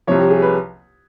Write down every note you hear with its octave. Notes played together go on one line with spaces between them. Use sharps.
C2 C3 F3 C#5
G4
G#4
B4